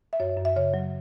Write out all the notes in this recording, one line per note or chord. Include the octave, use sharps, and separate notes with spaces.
E5
F#2 C#5
F#2
E5
C#3 C#5
F#3